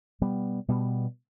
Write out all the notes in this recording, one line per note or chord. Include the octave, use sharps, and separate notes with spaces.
B2 G3 B3
B2 G3 B3